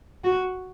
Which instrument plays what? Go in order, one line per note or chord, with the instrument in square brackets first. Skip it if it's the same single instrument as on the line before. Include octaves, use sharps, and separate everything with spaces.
[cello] F#4